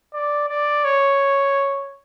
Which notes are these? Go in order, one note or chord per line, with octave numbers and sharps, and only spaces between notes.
D5
D5
C#5